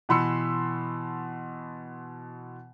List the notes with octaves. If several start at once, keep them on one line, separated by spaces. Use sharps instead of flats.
B2 E3 B5 C6 E6 C#7